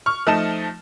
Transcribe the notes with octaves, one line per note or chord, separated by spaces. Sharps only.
C#6 F6
F3 A3 D#4 A5 E7